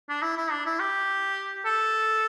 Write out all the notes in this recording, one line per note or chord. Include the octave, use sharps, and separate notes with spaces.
D4
E4
E4
D4
E4
G4
A4